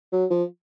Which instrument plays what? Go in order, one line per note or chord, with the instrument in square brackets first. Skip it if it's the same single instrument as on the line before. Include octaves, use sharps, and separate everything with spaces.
[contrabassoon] F#3
F3